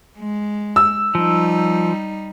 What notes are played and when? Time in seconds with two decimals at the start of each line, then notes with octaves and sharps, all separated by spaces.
0.19 G#3
0.76 E6
1.15 F3 G3 D#4